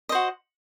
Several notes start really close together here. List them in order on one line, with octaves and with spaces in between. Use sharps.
D#5 C5 F#4